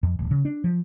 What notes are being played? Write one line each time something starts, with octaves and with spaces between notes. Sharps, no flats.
F2
D1
C#3
D4
F3